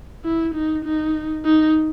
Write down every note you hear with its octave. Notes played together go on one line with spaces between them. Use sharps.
E4
D#4
D#4
D#4